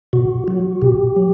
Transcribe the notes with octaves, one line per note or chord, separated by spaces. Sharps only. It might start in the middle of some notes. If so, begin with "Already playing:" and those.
B2 F#4
F#3 F#4
B2 G4
F#3